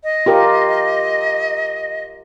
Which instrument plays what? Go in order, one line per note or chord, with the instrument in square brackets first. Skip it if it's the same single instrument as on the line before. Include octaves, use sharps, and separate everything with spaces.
[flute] D#5
[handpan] F4 G4 A#4